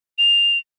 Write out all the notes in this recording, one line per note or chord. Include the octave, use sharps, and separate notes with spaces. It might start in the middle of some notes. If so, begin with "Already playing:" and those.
F7